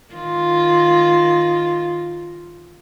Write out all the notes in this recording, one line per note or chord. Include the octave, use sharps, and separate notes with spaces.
D#3 F4